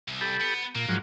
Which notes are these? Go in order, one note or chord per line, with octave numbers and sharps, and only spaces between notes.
C2
G4 A4 B5
B3
A#2 A#3
G#2 F3 F#3